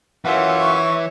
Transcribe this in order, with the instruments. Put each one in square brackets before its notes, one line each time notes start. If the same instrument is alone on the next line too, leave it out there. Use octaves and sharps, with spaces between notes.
[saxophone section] F#2 F4 F#5 [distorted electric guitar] E3 [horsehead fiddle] C#5 E5
[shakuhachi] C#6